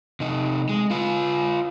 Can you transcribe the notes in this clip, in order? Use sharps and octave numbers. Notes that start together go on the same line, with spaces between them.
C3 D#4
G#3
F4 B4